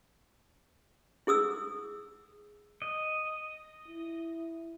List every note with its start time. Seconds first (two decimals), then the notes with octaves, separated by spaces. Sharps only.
1.27 E4 G#4 D#6 E6
2.82 D#5
3.88 E4